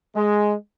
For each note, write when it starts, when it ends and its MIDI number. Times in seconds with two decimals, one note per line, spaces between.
0.15 0.55 56